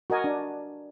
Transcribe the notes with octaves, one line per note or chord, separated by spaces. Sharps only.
F#4 A#4 D#5 G#5
D4